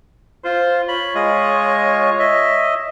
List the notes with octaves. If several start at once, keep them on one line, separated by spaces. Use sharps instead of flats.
F4 C5
C#5 B5
G#3 F4 D#5
D#5 E5